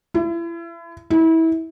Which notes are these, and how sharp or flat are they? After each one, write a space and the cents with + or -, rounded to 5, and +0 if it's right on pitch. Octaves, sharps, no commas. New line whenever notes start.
E4 +35
E4 -25